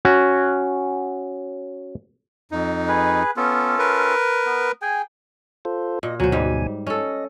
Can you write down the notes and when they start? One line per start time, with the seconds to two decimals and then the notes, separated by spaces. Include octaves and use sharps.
0.05 C#4 F#4
2.51 F2 D#4
2.88 G#4 B4
3.37 B3 C#4 F4 A4
3.78 A#4 B4
4.46 B3
4.82 G#4 G5 G#5
5.65 F4 A4 C5
6.03 A#2 D#5
6.20 D2 B2 F#3 C5 G#5
6.32 G#2 G3
6.87 C#4 A4 D#5